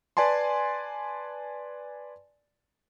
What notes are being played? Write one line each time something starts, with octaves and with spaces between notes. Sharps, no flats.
B4 D5 G#5 A5 C6